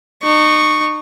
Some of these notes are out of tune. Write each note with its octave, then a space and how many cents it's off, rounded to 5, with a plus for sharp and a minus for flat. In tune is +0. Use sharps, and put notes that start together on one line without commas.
D#4 -35 C#6 +0